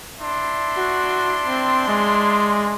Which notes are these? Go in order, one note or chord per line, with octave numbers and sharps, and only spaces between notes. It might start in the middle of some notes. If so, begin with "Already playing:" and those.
D4 E4 C6
F#4
C4
G#3